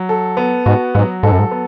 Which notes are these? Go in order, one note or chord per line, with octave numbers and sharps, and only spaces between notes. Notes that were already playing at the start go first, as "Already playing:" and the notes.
Already playing: F#3
A4
B3
G#2 F#4
G#2 F#3
G#2 A4
F#2
G#2
B3